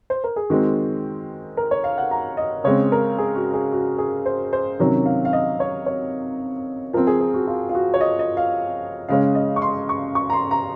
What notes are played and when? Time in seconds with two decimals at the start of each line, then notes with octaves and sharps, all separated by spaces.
0.10 C5
0.24 A#4
0.36 G#4
0.50 D#3 G#3 C4 F#4
1.57 A#4
1.71 C#5
1.84 F5
1.98 F#5
2.11 A#5
2.37 D#5
2.64 C#3 G#3 C4 C#5
2.92 A#4
3.18 G#4
3.36 F#4
3.54 G#4
3.72 F#4
3.98 G#4
4.26 C5
4.53 C5
4.79 C3 D#3 F#3 C#4
5.06 F5
5.25 F5
5.33 D#5
5.60 C#5
5.86 C#5
6.93 F3 C4 A#4
7.07 G#4
7.21 G#4
7.34 F#4
7.47 F4
7.69 F4
7.75 F#4
7.94 C#5
8.01 D#5
8.19 D#5
8.37 F5
9.09 C#3 G#3 C#4 F5
9.35 D#5
9.56 C#6
9.62 C6
9.89 C#6
10.15 C#6
10.30 A#5
10.33 C6
10.51 A#5